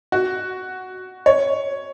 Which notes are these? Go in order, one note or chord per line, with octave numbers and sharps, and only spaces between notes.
F#4
C#5